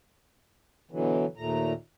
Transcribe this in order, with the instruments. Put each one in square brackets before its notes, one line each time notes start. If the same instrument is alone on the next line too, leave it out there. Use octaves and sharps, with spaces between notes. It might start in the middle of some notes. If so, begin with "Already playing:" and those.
[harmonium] B2 D3 E3 F#3
D#2 A#2 A3 A#5